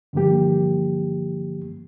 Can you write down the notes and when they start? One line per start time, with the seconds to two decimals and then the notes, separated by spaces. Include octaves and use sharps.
0.13 G2 D3 E3 F3 A#3 G4